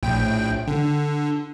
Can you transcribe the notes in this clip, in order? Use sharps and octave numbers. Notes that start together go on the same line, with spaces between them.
A#1 A2 G5
D3